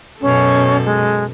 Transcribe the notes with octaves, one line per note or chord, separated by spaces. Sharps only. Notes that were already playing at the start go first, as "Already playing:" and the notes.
F#2 B2 C#4 A4
G#3